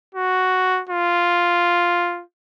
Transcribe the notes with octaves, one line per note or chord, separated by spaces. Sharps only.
F#4
F4